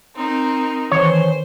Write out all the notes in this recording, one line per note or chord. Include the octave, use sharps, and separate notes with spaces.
C4 D#4 A#4
D#3 E3 C5 C#5